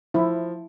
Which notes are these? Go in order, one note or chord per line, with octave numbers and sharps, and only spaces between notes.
F3 E4